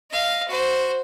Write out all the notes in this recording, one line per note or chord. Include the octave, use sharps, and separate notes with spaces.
D#5 F5
F#4 C5